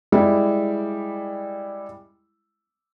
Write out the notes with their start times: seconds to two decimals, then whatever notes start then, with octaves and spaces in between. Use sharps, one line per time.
0.12 G3 G#3 E4